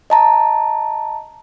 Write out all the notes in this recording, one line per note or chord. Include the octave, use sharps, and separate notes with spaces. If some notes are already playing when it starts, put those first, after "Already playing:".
D#5 A5 A#5